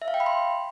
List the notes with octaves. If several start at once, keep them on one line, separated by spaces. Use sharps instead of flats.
E5
F5
G5
B5
C6